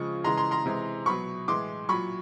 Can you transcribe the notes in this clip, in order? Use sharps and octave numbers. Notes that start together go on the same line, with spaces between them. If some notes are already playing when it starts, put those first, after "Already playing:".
Already playing: C#3 F3 G#3 C#6
C#3 E3 G#3 A#5 C6
A#5 C6
A#5 C6
C3 E3 G#3
B2 F#3 B5 C#6
A2 E3 G#3 C6 D6
A#2 F#3 B5 C#6